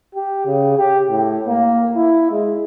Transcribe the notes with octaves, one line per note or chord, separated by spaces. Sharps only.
G4
C#3
G4
A2
A#3
E4
G#3